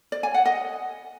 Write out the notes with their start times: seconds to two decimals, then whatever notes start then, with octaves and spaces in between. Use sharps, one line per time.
0.12 D5
0.23 G#5
0.34 F#5
0.46 D#5